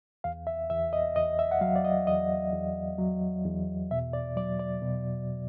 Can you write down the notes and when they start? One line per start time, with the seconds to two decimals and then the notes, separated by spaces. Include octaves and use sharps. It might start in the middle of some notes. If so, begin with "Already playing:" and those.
0.24 E2 F5
0.47 E5
0.70 E2 E5
0.93 D#5
1.16 E2 D#5
1.39 E5
1.51 F#5
1.61 F#3 F5
1.76 D5
1.84 D#5
2.07 E2 D#5
2.53 E2
2.99 F#3
3.45 E2
3.91 B2 E5
4.13 D5
4.36 F#3 D5
4.59 D5
4.82 B2